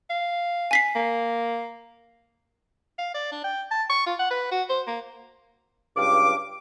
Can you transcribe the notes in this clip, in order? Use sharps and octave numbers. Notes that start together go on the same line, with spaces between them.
F5
G#5 B6 C7
A#3
F5
D5
D4
G5
A5
C#6
F4
F#5
B4
F#4
C5
A#3
C#2 G2 F5 D6